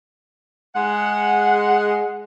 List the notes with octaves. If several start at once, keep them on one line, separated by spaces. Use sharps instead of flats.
G#3 G#4 F#5